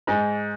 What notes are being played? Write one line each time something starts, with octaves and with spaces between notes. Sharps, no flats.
G#2